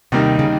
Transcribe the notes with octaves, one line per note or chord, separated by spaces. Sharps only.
D#2 C3 D#3 G3 A#3 D#4
C#3